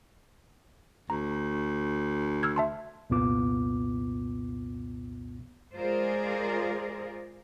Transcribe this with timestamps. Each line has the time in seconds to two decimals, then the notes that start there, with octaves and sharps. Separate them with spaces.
1.10 D2 A#5
2.43 E6 F6 G#6
2.56 E5 A5 C6
3.10 C2 F2 A#2 B3 F4 D6
5.75 G#3 F4 G#4 A#4 C5 D5